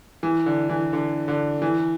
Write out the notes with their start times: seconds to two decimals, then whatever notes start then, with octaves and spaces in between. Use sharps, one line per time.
0.23 E3
0.46 D3
0.69 E3
0.93 D3
1.28 D3
1.62 E3